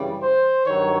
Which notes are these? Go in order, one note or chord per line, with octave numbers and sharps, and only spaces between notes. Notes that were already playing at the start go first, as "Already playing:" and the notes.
Already playing: F#2 C#3 E3 G3
C5
G2 D#3 F#3 C#5